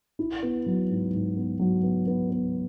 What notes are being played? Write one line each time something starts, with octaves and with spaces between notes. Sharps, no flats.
E4
B3
F#3
G#2
G#2
B3
F#3
B3
B3
B3